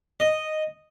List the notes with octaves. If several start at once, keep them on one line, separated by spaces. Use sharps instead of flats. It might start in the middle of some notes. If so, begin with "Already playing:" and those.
D#5